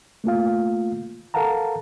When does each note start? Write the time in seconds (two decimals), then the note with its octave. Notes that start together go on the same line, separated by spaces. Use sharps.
0.24 A3 A#3 F4 F5
1.34 A4 A#4 F5 F#5 A5 A#5